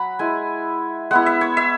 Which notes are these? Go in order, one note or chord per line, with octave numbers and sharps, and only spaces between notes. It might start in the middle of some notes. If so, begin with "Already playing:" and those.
Already playing: F#3 F#5 B5
G#3 E4 G#5
G#3 B3 E4 F#5
E5
C#5
E5